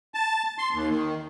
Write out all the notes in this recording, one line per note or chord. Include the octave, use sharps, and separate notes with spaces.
A5
C6
D#2
D#3